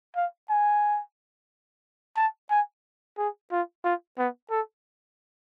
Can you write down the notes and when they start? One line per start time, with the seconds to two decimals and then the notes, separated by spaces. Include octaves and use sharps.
0.16 F5
0.50 G#5
2.16 A5
2.51 G#5
3.18 G#4
3.51 F4
3.84 F4
4.18 B3
4.51 A4